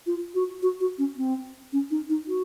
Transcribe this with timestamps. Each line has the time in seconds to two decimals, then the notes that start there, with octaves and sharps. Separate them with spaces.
0.07 F4
0.34 F#4
0.62 F#4
0.81 F#4
0.98 C#4
1.17 C4
1.73 C#4
1.91 D#4
2.10 D#4
2.28 F#4